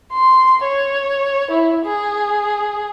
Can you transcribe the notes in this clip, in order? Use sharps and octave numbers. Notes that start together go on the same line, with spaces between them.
C6
C#5
E4
G#4